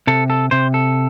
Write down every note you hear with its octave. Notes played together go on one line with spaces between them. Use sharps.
C3 A4
A4
C3 C5
A4